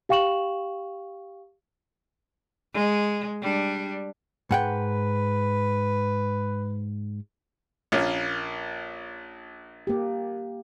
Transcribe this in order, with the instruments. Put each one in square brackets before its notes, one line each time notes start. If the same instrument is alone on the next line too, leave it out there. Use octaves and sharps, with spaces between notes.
[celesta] G4 F5 G5 C#6 E7 F#7
[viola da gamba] G#3
G3 D4
[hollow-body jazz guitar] G#2 F#5 G5 [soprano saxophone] B4
[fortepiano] A#1 C#4 F4
[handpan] A#3 G4